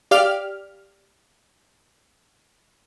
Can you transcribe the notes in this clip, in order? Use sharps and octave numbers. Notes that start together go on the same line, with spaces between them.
G4 D5 F5 F6